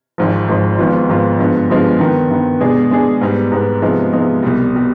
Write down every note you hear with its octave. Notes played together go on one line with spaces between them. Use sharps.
G#1 G#2 F3
G#1 G#2 F3
G#1 G#2 F3 B3 F4
G#1 G#2 F3 B3 F4
G2 D3 F3 G#3 B3
G2 D3 F3 G#3 B3
G2 D#3 B3
G2 D#3 B3
B2 G#3 D4 G#4
B2 G#3 D4 G#4
G#2 G3 B3
G#2 G3 B3
C3 F3 G#3 B3 D#4
C3 F3 G#3 B3 D#4
C2 B2 G3
B2 G3